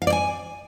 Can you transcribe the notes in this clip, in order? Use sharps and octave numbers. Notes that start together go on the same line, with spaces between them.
F5
D5
G#5